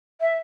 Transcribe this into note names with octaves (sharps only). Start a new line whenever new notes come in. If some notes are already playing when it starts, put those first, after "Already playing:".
E5